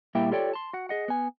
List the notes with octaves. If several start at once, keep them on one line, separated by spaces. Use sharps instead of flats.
A#2 G3 A#3 E4 E5 G5
F4 G4 A4 C#5 D5 G5
A5 C6
F#4 F#5
G#4 D#5 F#5
B3 G#5